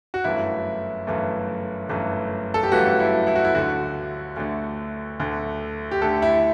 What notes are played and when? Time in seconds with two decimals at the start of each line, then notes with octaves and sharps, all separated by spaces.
0.14 F#4
0.24 G1 F#2 E3 A3 E4
1.07 G1 F#2 E3 A3
1.89 G1 F#2 E3 A3
2.54 A4
2.63 G4
2.72 G1 F#2 E3 A3 F#4
3.00 E4
3.27 E4
3.35 F#4
3.45 E4
3.55 D2 D3 A3 F#4
4.36 D2 D3 A3
5.20 D2 D3 A3
5.91 G4
6.02 D2 D3 A3 A4
6.22 E4